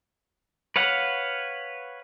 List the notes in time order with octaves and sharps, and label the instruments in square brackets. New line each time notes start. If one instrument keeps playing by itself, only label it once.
[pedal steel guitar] B4 C#5 F5 F#5